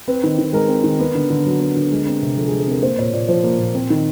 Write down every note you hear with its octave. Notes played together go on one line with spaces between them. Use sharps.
C4 B4
D#3
D#3
G#3 A#4
C4
D#3
B3
D3
D3
F#3
B3
D3
G#3
C4
C3
F3 A4
G#3 G#4
A4
C4 A#4
A#3 C5
A#2 C#5
A#2 D5
F3 C5
A#3
A#2
C4
D#3